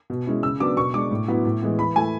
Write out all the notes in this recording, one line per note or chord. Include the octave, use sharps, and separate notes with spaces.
B2
G#3 C#4 E4
C#3 E6
F#3 B3 D4 D6
B2 C#6
G#3 D4 D6
A2
F#3 B3 E4
A2
E3 G#3 B3
E3 B5
A3 E4 G#5